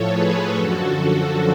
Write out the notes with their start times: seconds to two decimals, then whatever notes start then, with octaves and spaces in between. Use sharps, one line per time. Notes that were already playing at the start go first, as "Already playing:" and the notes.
Already playing: A2 F3 A4 C#5
0.09 G#4 B4
0.54 F#2 D3 F3 F#4 A4